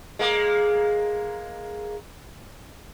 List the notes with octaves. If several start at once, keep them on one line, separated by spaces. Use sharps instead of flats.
G#3 A#3